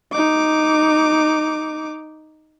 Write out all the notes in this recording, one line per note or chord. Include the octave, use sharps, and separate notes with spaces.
D#4 D6